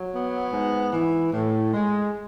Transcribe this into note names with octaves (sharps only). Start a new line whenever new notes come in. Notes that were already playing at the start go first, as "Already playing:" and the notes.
Already playing: F#3
B3
G#2
E3
A2
G#3